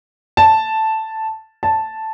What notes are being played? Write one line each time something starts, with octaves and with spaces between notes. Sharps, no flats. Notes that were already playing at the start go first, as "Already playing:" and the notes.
A5
A5